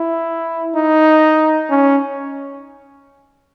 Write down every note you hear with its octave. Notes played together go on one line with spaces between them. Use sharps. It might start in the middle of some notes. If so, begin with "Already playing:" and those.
Already playing: E4
D#4
C#4